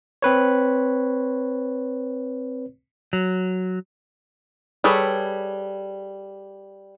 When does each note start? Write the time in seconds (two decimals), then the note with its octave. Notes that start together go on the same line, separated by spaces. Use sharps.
0.22 C4 B4 C#5
3.13 F#3
4.84 G3 G#4 A4 B4 C#5